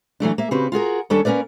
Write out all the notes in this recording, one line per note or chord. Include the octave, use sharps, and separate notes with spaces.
E3 F#3 A3 D4
A#3 E5
C#3 C4 F#4 G4 B4
F4 F#4 G#4 A#4
D#2 G3 C#4 D4 A4 A5
A#3 C#4 A#4 B4 D5